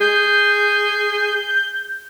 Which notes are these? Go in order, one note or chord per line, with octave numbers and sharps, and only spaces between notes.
G#4 G6